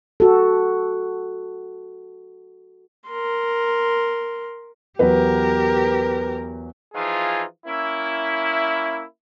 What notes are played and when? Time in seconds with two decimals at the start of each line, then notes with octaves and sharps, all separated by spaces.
0.20 F#4 A4
3.09 A#4 C6
4.99 E2 F#3 B3 G4 A#4 B4
6.94 E3 F3 D#4 F4 G#4
7.66 A#3 C#4 E4